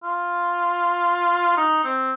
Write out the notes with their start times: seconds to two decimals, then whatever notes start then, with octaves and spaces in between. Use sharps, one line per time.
0.03 F4
1.57 D#4
1.84 C4